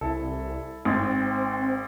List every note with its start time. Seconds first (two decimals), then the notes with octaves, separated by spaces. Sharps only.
0.01 C2 E4 A4
0.85 G#1 C4